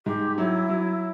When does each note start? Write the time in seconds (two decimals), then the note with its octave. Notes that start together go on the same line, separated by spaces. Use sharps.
0.06 G#2 G4
0.38 F#3 E4
0.69 F#3